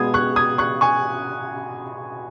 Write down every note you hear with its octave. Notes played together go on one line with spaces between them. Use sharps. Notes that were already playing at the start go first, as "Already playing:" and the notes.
Already playing: B2 G#3 B3 D#6 G#6
C#6 F#6
D#6 G#6
C#6 F#6
G#5 C#6